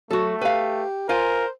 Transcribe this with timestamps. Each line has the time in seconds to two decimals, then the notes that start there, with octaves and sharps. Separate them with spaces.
0.11 F#3 A3 F#4 A4
0.41 G4 B4 F5
1.09 F4 A#4 C5 F5 G#5